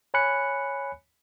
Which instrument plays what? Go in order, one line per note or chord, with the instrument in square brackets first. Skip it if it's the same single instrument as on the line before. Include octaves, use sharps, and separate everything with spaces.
[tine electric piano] C#5 G#5 B5 F#6 C#7